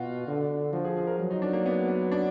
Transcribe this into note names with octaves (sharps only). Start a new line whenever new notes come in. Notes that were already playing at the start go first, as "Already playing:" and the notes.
Already playing: B2 F4 F#4
D3
F3 F#4
G#4
G#4
A#4
F#3
D#4
D4
A#3
B3
B3
D4